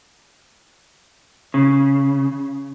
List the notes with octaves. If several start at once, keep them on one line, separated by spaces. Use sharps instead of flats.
C#3